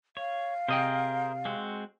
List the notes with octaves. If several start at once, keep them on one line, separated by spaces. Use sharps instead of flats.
C#5 F5
C3 G#4 A#4 C5 D#5 G5
G#3 C4 F#4